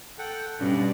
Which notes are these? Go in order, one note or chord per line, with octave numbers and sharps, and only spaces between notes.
A4 F#5 G5
G2 B2 C#4 D5